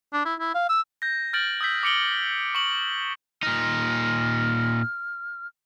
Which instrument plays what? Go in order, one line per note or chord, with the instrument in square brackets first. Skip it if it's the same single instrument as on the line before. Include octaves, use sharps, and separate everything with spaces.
[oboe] D4
E4
E4
F5
E6
[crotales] G6 A#6
F6 G6 A6 D7 F#7
D#6 E6 G6 B6
D6 E6 C#7 D7 F#7 G7
C#6 D6 F#7
[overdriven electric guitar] A#2 D#4 [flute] F6